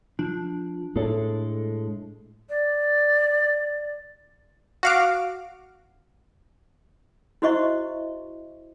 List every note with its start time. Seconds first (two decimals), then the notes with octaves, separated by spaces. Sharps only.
0.19 F3 D4
0.96 A2 G#3 A4
2.49 D5
4.83 F#4 F5 D6
7.42 E4 F#4 C5 D#5 E5 C#6